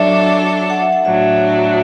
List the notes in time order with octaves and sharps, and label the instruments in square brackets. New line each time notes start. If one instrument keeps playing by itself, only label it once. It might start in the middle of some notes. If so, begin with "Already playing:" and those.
Already playing: [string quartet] F#3 D4 A4 [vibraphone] D5 E5
[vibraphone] F#5
E5
F#5
[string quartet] A2 F#3 D4 [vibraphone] E5